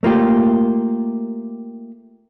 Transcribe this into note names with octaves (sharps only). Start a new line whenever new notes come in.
A3 A#3 F4 G4